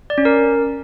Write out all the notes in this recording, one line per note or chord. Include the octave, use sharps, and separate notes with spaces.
D5
C#4
A#4